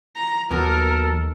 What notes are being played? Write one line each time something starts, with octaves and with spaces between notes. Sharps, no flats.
A#5
D#2 E3 F#3 B3 A4 A#4